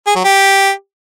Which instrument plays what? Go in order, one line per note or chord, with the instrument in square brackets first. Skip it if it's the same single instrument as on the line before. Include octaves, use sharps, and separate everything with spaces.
[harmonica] G#4
F#3
G4